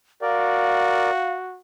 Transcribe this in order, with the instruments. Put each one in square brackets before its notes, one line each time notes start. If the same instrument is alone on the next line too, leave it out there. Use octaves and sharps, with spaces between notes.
[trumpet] F#4 [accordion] A#4 D5 [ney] F5